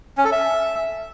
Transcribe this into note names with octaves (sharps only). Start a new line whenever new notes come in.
C#4
A4
E5